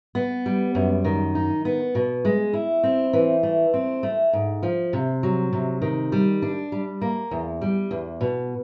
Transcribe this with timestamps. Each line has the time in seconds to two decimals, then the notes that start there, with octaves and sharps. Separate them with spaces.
0.15 B3
0.46 G3
0.75 F#2
1.04 D#3
1.35 D#4
1.65 B3
1.95 B2
2.25 G#3
2.53 E4
2.83 C4
3.13 E3
3.43 A3
3.74 C4
4.03 A3
4.33 G#2
4.63 F3
4.93 C3
5.23 F#3
5.53 C3
5.82 D#3
6.12 G3
6.42 D4
6.72 G3
7.01 A#3
7.31 E2
7.61 G3
7.91 E2
8.21 B2